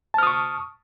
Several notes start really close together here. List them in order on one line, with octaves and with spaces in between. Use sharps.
A5 F6 D#6 C#6